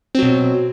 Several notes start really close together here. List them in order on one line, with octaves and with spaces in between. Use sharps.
C4 F#3 B2